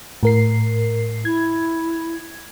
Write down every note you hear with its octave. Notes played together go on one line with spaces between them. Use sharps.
A2 A#4 C7
E4 G#6